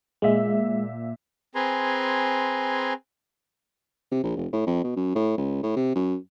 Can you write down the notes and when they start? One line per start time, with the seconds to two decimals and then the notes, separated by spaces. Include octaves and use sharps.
0.22 A#2 G#3 E5
1.55 C4 G#4 B4 G#5 A#5 C6
4.11 C3
4.23 A#1
4.36 F1
4.53 A2
4.67 F2
4.84 B2
4.96 F#2
5.15 A2
5.38 C#2
5.63 A2
5.76 C3
5.95 F#2